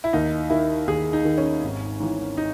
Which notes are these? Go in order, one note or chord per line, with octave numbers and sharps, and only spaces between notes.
E4
D#2 D#4
D#3 E4
D#2 G#4
D#4
D#3
C#4
G#1
G#2 E3
D#4